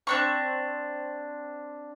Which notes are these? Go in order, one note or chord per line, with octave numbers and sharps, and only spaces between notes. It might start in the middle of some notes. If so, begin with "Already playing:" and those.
C4 D4 C#6